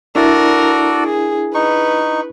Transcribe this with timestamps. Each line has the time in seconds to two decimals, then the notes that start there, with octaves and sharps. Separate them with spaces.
0.16 D4 E4 F#4 A4 A#4 D5
1.05 G#4
1.54 D#4 B4 C#6